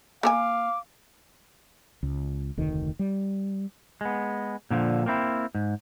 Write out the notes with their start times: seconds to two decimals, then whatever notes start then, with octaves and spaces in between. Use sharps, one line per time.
0.23 A#3 A#4 F5 G#5 D6
2.03 C#2
2.57 F1 D2 D#3
2.99 G3
4.01 G#3 B3
4.71 A#2 D3 E3 F3
5.06 A#3 C4 E4
5.55 G#2